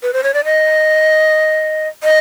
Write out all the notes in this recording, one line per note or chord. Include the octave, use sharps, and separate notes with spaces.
B4
C5
C#5
D5
D#5
D#5